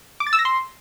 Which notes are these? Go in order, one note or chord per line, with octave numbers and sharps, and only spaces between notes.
D6
A6
E6
A#6
C6